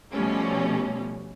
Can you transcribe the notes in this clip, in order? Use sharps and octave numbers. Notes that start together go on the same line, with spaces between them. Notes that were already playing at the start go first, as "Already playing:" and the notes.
B2 F3 G3 A3 C#4